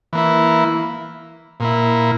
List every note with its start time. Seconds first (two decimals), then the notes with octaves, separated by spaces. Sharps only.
0.13 E3 A#3 E4
1.60 A#2 A#3 E4